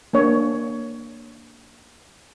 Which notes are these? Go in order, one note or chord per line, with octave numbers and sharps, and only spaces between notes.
A#3 D4 C#5